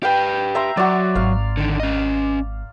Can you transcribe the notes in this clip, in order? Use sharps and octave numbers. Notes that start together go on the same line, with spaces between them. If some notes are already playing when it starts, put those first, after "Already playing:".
G4 B4 F5 G5
E5 A#5 C6
F#3 F#4 D5
G#1 F5
D3 D#3
C#4 D#5